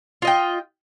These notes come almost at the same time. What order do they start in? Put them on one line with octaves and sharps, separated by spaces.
F4 D#5 G5